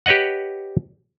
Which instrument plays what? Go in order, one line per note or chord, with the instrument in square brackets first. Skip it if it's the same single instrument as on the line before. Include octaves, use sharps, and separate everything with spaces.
[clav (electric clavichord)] G4 B4 C#5 D#5 F#5